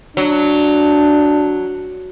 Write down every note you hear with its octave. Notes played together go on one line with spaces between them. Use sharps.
F#3 D4